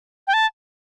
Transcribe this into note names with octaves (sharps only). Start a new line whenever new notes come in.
G5
A5